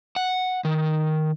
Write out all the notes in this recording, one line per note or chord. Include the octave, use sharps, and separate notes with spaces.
F#5
D#3